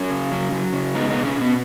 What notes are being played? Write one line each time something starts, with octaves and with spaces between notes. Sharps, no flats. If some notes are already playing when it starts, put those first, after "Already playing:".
Already playing: F#3 C#4
C#3
F#3
F#3
C#3
G#3 B3 D#4
B2 B3 D#4
C#4
B2
B3